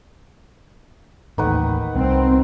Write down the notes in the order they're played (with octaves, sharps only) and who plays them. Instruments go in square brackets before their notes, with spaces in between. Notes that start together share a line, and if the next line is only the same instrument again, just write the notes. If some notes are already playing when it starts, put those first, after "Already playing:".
[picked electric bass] A1 D#2 [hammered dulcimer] D#3 B4 F#5
[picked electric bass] C2 [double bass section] C4